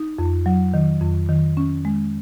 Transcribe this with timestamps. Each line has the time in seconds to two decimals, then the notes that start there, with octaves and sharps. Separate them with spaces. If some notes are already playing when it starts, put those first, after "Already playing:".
Already playing: D#4
0.19 F2
0.46 F#3
0.74 D#3
1.01 F2
1.29 D#3
1.57 C#4
1.85 G#3